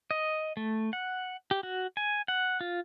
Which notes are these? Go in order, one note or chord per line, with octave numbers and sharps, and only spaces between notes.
D#5
A3
F#5
G4
F#4
G#5
F#5
F4